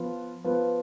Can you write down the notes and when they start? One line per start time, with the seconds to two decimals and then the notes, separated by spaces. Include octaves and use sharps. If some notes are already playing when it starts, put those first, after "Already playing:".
Already playing: F3 B3 F4 B4
0.44 F3 B3 F4 B4